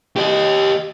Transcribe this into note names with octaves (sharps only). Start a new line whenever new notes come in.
G4 D#5